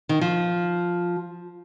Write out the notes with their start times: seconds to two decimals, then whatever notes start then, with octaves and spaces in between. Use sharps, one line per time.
0.09 D#3
0.21 F3